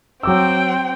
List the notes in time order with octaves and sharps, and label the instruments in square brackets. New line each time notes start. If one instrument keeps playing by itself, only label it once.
[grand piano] F#3 D6 E6 [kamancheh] C4 G5